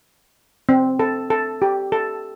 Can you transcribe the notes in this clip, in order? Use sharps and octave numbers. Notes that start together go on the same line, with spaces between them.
C4
A4
A4
G4
A4